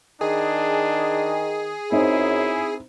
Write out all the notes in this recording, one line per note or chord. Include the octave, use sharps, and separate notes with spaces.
D#3 D4 G#4
F#2 C4 D#4 E4 C5